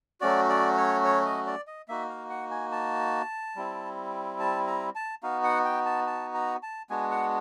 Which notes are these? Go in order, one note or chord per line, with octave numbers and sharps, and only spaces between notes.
F#3 A3 C#4 F#4 D5
D5
C#5
C#5
D#5
D5
D#5
A#3 D#4 F#4 E5
F5
F#5
G#5
A5
G3 C4 E4
A5
A#5
A5
B3 D#4 F#4 F5
F#5
G5
A5
A5
A#5
A5
G#3 B3 D4 F#4 G#5
F#5